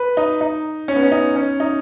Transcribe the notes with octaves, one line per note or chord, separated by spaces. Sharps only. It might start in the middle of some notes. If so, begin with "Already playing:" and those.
Already playing: B4
D#4
D#4
C#4
B3
C#4
D#4
C#4
D#4